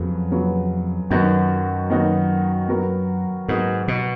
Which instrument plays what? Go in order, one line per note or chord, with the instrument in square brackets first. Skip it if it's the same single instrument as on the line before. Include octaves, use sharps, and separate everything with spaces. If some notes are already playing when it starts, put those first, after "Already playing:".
Already playing: [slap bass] F2 [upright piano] C#3 F#3 B3
[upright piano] C#3 F#3 B3 F4
[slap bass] F#2 [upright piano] D#3 F#3 B3 D#4 F#4
[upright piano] D#3 F#3 B3 D#4 F#4
F#3 B3 F#4 A#4
[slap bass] G#2 [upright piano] F#3 B3 F#4 A#4
[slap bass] B2